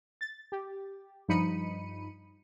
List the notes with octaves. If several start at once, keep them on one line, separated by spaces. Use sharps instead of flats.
A6
G4
G2 F3 D#4 B5 C#7 D#7